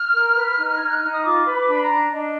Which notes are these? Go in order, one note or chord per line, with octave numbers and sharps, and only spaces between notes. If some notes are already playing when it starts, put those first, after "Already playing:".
Already playing: F6
A#4
B4
D#4
D#4 G#6
F#6
D#4 F6
D#6
F4 D6
B4
B5
D6
D4 B5
A#5
D4
D4 D#5